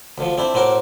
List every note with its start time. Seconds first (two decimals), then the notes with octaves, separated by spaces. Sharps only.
0.18 D2 D3 F3
0.38 C4 D4 E4
0.54 A2 C4 F#4 A#4 D6